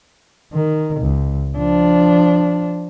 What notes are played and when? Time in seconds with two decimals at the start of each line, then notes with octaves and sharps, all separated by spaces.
0.53 D#3
1.00 C#2
1.58 F3 D4